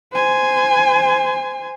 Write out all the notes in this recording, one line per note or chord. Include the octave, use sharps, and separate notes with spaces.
C5 G#5